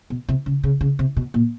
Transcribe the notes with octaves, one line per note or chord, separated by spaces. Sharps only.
B2
C3
C#3
C#3
C#3
C3
B2
A#2